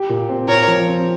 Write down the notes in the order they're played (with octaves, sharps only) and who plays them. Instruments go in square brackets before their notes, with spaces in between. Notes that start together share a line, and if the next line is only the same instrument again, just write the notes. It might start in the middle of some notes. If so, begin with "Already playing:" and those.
Already playing: [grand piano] G4
A#2
C4
[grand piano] A#2 [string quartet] A#4 C#5
[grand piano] F3
C4